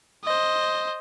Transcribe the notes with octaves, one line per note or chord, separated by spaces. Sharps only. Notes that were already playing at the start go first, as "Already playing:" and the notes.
C5 D#5